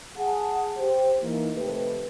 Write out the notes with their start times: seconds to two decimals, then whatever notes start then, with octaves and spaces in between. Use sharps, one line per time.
0.17 G#4 F#5 A5
0.78 G4 C5
1.21 E3 A#3 D#4
1.55 C3 D#3 F3 A3 G4 B4